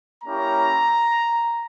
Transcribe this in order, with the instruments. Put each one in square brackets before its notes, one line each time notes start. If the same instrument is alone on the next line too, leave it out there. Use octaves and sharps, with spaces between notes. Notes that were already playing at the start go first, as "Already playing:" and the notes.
[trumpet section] A#3 C#4 E4 G4 A#5